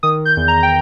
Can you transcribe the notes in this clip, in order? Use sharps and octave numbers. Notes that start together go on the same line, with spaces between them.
D#3 D#6
G6
E2
A#5
G5